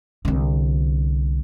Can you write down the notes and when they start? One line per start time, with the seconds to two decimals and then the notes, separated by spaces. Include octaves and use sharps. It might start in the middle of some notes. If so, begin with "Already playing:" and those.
0.25 C2 D3